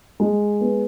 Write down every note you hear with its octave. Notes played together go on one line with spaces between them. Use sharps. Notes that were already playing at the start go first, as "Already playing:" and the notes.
G#3
B3